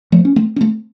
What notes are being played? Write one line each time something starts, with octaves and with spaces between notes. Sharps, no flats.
F3 A3
C#4
A3 C4
C#4
A3 C4